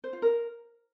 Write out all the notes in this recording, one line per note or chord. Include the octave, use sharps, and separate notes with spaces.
C5
F4
A#4